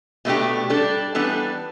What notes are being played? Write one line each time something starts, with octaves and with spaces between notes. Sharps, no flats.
B2 A3 D4 G4
G3 D4 A4
E3 G3 B3 D4 A4